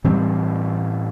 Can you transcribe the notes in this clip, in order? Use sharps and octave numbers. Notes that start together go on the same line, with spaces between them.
A2 E3 G3 C4